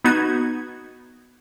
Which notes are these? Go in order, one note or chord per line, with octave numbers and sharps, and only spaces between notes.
B3 D#4 F#4 G#6